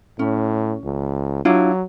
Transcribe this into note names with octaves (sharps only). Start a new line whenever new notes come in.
A2 C#4
C#2
F#3 D4 E4 F4